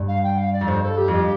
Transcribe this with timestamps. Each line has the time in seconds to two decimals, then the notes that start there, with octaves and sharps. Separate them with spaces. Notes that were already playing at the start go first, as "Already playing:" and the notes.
Already playing: G2
0.08 F5
0.23 G5
0.38 F5
0.53 D5
0.61 F2
0.68 G2 C5
0.83 A4
0.98 G4
1.08 F2 G4